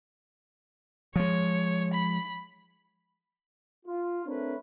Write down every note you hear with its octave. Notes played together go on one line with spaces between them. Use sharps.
F3 G#3 C#5
B5
F4
A3 C4 D4 A#4 B4 C#5